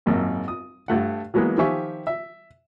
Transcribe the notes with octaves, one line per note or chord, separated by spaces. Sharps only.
G#1 F#2 A#2
D#6
G2 A3 F#5
E3 F#3 G#3 A#3 B3
D#3 F3 G4 E5 G#5 C#6
E5